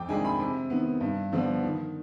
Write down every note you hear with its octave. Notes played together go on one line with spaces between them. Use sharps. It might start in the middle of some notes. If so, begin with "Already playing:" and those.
Already playing: F2 G5 D6
C3 D#3 G#3 D4 G#5
B5
C3
D#3 B3
G2
D3 F3 B3 D4
D#3